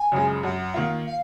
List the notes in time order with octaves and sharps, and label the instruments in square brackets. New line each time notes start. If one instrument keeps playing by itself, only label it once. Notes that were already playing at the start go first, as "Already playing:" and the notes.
Already playing: [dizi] G#5
[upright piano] F#2 C#3 F3 G#3
[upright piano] F#2 [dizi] F#5
[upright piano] D#3 A#3 F4
[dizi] F5